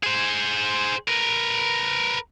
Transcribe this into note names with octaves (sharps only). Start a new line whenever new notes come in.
G#4 C5
A#4 B4